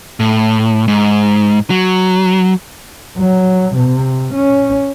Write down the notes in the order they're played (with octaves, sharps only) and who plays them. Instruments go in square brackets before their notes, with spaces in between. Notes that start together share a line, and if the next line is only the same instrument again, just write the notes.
[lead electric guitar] A2
G#2
F#3
[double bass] F#3
C3
C#4